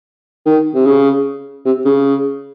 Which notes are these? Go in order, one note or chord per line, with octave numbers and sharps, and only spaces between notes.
D#3
C3
C#3
C3
C#3